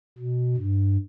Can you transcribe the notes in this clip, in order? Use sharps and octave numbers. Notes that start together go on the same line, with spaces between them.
B2
G2